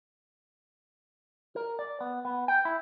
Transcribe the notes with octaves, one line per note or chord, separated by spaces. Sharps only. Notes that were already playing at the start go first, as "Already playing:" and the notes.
A#4
D5
B3
B3
G5
E4